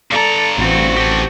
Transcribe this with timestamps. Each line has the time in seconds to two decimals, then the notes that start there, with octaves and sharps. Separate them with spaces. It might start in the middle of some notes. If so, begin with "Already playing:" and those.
0.11 G2 A4 D5 A#5
0.58 A1 C4 F#4
0.97 G4 A4